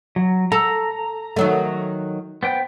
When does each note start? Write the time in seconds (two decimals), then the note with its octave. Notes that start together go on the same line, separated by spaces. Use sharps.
0.16 F#3
0.52 A4 A#5
1.36 D#3 F#3 A3
2.43 B3 C5 G5